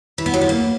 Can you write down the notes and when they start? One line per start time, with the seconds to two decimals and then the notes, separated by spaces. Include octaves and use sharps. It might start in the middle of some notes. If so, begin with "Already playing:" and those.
0.18 E3
0.26 B3
0.34 F#3
0.41 B3
0.49 A#3